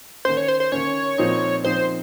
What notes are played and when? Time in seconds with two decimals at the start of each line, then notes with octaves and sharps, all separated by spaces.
0.25 D#3 A#3 C#4 C5
0.37 C#5
0.48 C5
0.60 C5
0.72 D#3 A#3 C#4 C#5
1.18 A#2 F3 C4 D#4
1.64 A#2 F3 C4 D#4 C5